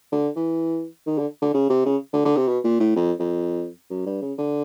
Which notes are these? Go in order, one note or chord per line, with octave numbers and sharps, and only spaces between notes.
D3
E3
D#3
D3
D3
C#3
C3
C#3
D3
D3
C3
B2
A#2
A2
F2
F2
F#2
G2
C#3
D3